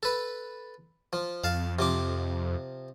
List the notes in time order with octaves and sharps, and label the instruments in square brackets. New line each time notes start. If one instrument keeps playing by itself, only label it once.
[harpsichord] A4 B4
F3
[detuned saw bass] F2 [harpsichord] F5 A5
[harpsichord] C3 F3 D6